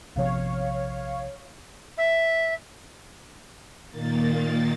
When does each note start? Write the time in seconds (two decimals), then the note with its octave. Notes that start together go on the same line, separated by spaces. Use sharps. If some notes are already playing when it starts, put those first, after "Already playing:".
0.16 A#1 C3 F3 C#5 F5
1.97 E5
3.90 A#2 D#3 A#3 A6